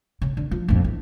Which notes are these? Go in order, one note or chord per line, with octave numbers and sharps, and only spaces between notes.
C#3
D3
F3
A#1 F2
E3